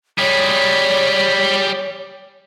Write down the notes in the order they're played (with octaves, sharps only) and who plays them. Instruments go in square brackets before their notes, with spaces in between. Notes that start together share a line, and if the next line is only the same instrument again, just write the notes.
[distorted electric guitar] G3 G#4 [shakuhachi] C#5